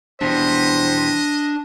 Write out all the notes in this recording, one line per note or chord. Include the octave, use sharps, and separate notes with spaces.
E2 B2 G3 D4 C5 D#5